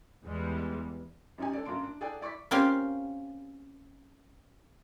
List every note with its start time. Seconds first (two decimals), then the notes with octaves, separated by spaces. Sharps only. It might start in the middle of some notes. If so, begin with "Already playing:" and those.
0.23 E2 E3 G3 G#3
1.38 F#2 C#4 D#4 G4 G#5
1.53 D4 A4 C#5 D5
1.65 F#2 A#3 D4 C6 D7
1.83 D4
2.01 G#4 A4 D5 F#5 G5
2.21 E4 D5 C#6 D6 B6
2.51 A#3 C4 C#4 F4 G4